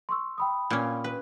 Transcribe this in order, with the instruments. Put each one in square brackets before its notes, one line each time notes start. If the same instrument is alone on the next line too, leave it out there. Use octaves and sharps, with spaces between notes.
[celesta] C6 C#6 E6
G5 B5 D#6
[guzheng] A#2 C#4
B4